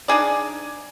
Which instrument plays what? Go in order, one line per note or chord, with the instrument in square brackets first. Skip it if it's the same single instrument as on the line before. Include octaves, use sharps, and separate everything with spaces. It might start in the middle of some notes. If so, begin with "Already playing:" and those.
[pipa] D4 D#4 G#4 D5